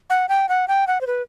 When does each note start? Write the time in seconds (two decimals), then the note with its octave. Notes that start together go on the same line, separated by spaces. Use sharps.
0.10 F#5
0.29 G5
0.49 F#5
0.68 G5
0.87 F#5
1.01 C5
1.07 B4